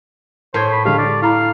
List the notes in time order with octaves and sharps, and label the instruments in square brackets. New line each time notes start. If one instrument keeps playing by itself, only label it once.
[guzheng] A2 [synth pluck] A#4 G#6 [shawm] C5
[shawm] B5
[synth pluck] D3 G#3 G4 [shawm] F5
[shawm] D5
[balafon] E4 A#5 B5 [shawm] F5